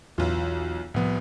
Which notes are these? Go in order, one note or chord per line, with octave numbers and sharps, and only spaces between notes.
B1 E2 E3 F4
C2 A2 C3 F3 B3